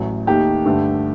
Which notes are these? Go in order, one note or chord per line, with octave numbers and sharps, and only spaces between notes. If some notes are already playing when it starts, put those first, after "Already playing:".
Already playing: A1 A2 F#3
D#2 D#3 A3 D#4 G4
G2 D3 A3